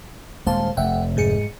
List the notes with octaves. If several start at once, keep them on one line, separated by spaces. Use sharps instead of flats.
D#1 G#3 A#3 C5 F5 A5
F1 A3 E5 F#5 G5
G#2 G#4 C#7